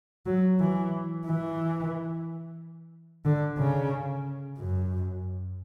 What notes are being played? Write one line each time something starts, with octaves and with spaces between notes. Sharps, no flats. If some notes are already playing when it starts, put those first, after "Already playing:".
F#3
E3
E3
D3
C#3
F#2